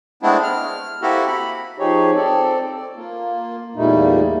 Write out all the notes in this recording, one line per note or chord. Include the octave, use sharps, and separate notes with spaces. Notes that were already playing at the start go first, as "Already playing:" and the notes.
G#3 A3 B3 C4 D4 E4
F6
A#3 C4 E4 F#4 G4 A4
B5
F3 D#4 G4 G#4 C#5
C4 A4 D5
D5
A#3 F4
E2 A#2 G3 A3 A#3 D#4